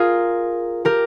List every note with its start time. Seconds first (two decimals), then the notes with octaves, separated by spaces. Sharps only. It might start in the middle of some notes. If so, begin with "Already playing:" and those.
Already playing: F4 G#4 A#4
0.85 G4 A#4